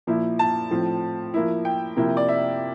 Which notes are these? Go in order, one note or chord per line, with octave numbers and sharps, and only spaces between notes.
A#2 F3 A#3 E4
A5
A2 F3 C4
F3 A#3 E4
G5
C3 F3 A#3 E4
D5
E5